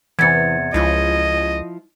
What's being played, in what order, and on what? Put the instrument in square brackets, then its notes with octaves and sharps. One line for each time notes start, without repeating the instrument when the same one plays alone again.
[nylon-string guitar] E2 C3 [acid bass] E3 [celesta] G#6 A6 C#7
[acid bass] C#2 [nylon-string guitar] F3 E4 F4 [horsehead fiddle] D#5